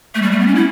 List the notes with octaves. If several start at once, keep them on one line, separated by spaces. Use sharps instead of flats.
A3
G3
A3
B3
C#4
E4